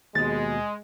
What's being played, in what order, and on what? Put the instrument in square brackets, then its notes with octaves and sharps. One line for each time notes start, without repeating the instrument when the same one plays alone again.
[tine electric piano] D#2 B2 [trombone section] G#3 [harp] A6